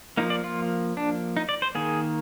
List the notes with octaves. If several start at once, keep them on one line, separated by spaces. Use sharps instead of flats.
F3 A#3 D#4
D5
F4
D4
D#4
D5
C5
D#3 A#3 G#4